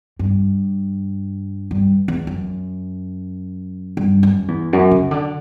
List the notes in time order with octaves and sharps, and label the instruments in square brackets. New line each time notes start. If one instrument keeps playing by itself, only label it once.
[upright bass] G2
G2
E2
F#2
G2
F#2
E2
F#2
C#3
D3